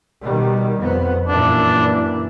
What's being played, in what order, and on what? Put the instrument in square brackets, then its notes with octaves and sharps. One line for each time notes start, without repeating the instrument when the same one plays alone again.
[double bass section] B2 D#3 G3
F2 B3
[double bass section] F#2 A#2 E3 [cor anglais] D4